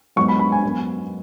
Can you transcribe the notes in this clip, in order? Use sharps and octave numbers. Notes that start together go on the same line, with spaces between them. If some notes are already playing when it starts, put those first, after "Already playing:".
G#2 F#3 B3 C#6
B5
B5
G#5
F#2 F#3 B3